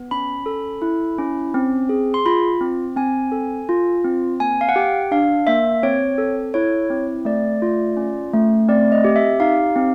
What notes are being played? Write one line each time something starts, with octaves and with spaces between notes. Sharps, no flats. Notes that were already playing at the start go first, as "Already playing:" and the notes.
Already playing: B3
C#4 B5
A4
E4
C#4
C4
G#4
C6
F4 B5
C4
C4 G#5
A4
F4
C4
A#3 G#5
F5
F#5
G4 G5
D4 F5
A#3 E5
C4 C#5
A4
E4 C#5
C4
A3 D5
F4
C#4
A3
C4 D5
D#5
G4
E5
D#4 F5
C4